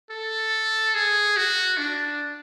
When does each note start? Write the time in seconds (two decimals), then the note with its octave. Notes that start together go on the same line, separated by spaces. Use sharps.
0.10 A4
0.94 G#4
1.37 F#4
1.77 D4